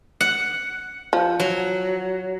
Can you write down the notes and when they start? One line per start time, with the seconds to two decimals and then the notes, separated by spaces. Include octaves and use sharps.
0.21 F#5
1.13 F3
1.40 F#3